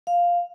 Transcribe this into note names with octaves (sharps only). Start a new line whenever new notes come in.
F5